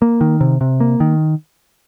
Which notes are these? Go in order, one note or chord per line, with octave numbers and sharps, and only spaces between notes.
A#3
D#3
C3
C3
A#3
D#3